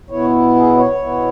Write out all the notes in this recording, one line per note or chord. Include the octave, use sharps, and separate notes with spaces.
B2 B3 E4 C#5
G#4
C#5
B2 B3 E4